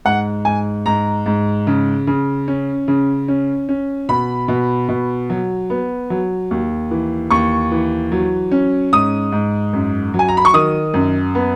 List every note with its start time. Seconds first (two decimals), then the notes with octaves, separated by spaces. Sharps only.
0.05 G#2 F#5
0.45 G#2 G#5
0.86 G#2 A#5
1.26 G#2
1.67 C#3
2.07 C#3
2.48 C#4
2.88 C#3
3.28 C#4
3.69 C#4
4.09 B2 B5
4.48 B2
4.89 B2
5.30 F#3
5.70 B3
6.10 F#3
6.51 D#2
6.91 E3
7.31 D#2 C#6
7.72 E3
8.12 F#3
8.52 C#4
8.92 G#2 D#6
9.32 G#2
9.73 F#2
10.14 F#3
10.19 G#5
10.28 A#5
10.37 B5
10.45 C#6
10.54 D#3 D#6
10.94 F#2
11.35 B3